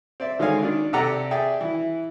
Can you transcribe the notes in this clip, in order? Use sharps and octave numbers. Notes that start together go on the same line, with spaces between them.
C4 D5 E5
D3 D#3 G#3 C#5 F5 G#5
D#3 D4
C3 G4 A4 D5 F#5 A#5
G#4 D5 E5 G5
E3 E4